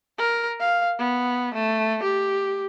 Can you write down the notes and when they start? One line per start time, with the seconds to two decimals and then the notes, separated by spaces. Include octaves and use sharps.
0.18 A#4
0.60 F5
0.99 B3
1.54 A3
2.03 G4